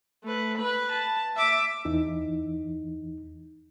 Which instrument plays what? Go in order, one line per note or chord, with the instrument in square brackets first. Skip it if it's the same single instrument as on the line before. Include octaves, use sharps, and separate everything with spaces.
[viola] A3 B4
B4 B5
A5
E5 D6
[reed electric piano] E2 E3 D#4